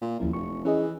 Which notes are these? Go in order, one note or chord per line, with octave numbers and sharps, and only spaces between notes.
A#2
F#1 D#2 F3 E4
F1 C#6
E3 C#4 G#4 D#5